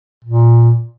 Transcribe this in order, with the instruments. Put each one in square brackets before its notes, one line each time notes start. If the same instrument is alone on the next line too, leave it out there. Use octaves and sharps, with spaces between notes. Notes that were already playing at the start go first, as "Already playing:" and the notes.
[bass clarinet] A#2